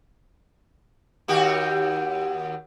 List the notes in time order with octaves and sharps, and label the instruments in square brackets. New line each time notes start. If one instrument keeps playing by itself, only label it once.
[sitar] D#2 F#4 G4